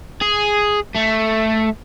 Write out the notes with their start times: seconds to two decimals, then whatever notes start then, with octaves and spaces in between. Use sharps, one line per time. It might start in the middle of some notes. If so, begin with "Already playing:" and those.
0.22 G#4
0.96 A3